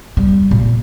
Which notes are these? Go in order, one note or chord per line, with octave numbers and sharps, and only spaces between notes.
G3
A#2